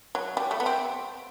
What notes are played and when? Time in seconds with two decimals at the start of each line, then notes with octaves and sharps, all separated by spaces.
0.15 F#3
0.37 G3
0.51 A3
0.60 B3
0.66 C4